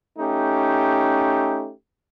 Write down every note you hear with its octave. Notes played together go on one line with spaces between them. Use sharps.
A3 C#4 D#4 G4